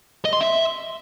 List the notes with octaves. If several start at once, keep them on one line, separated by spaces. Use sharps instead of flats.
D#5
C6
E5